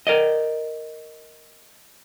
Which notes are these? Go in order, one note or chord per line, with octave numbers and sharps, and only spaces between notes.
A#4 D5 D#5